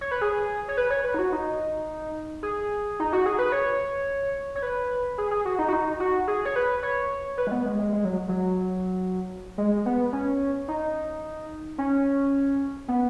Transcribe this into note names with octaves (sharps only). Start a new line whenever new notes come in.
C#5
B4
G#4
C#5
B4
C#5
B4
D#4
F#4
D#4
G#4
D#4
F#4
G#4
B4
C#5
C#5
B4
G#4
G#4
F#4
D#4
F#4
D#4
F#4
G#4
C#5
B4
C#5
B4
G#3
B3
G#3
G#3
G#3
F#3
F#3
G#3
B3
C#4
D#4
C#4
B3